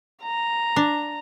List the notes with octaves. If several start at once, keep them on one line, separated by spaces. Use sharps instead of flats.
A#5
D4